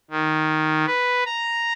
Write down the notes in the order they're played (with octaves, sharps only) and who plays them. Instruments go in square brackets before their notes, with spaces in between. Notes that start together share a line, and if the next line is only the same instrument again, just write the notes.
[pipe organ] D#3
B4
A#5